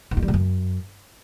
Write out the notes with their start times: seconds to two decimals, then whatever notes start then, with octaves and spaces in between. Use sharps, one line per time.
0.11 D#3
0.17 G2
0.22 G3
0.28 G#2
0.34 F#2